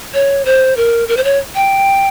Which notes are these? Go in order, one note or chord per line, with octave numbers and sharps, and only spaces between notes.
C#5
C5
A#4
A#4
C5
C#5
G5